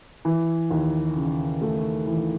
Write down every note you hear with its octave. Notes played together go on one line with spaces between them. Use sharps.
E3
D#2
C#3
A3
E3